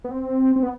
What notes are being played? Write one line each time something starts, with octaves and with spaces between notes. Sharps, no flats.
B3
C4
C4
B3